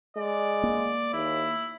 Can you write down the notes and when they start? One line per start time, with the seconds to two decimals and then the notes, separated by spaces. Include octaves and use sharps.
0.17 G#3 D5
0.63 A#3
1.14 D#2 E4